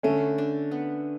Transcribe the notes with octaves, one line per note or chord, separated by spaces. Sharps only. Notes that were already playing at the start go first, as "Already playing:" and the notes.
D3 A3 C#4
D4
B3